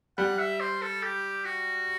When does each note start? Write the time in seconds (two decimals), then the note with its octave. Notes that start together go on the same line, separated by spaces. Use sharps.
0.18 G3 F#5
0.39 E5
0.60 C5
0.82 A4
1.03 G4
1.45 F#4